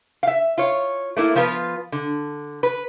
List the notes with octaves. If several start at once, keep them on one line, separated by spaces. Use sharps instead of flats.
E5 F5
F4 C#5
A3 A#3 E4
F3 B3 F4 B4
D3
B4